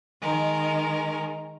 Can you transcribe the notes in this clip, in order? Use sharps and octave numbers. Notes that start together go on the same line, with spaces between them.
D#3 G#3 A#4